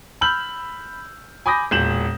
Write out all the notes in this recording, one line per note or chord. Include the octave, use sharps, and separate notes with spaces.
B5 E6 F6 G6 F#7
G#5 B5 D6 D#6 G6 A#6
E1 A#2 G6 E7 F#7